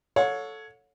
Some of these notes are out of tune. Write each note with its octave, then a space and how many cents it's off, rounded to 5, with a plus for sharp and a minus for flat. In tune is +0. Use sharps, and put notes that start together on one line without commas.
A4 +0 C#5 +5 F#5 -45